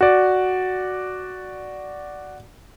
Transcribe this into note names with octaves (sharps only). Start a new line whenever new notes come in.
F#4 D5